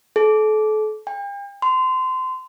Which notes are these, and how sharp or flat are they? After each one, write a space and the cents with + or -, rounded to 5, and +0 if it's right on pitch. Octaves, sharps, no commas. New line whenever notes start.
A4 -35
G5 +40
C6 -25